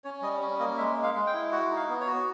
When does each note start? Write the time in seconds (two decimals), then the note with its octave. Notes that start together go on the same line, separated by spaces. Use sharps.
0.04 C#4 C#5
0.22 G3 D#5
0.40 C#4
0.59 A#3 D#5
0.77 G#3 E5
0.96 G#3
1.03 F5
1.14 G#3
1.27 G5
1.33 E4
1.52 F#4 F#5
1.70 D#4
1.76 F5
1.89 B3
2.00 C#5
2.07 F#4